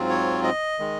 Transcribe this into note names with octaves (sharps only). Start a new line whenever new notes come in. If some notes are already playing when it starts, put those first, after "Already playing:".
Already playing: G#2 F#3 C4 F4
C#5
D#5
D#3 G#3